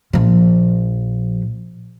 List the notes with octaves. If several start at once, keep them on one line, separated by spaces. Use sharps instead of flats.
A#1 F3